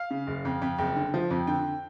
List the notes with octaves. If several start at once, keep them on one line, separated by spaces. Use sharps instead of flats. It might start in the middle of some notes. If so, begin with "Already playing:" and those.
Already playing: F5
C#3
F#1
F2
F2
F#1 G5
D3
F3
F2
D3 G5